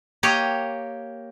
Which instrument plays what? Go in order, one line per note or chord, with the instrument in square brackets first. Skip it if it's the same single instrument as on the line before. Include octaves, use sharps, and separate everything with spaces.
[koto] A#3 G4 C#5 D#5 G5